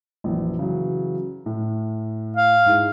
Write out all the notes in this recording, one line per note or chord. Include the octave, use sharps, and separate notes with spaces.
A#1 F#2 E3
C#3 E3 F#3
A2
F5
G#2 E4 G#4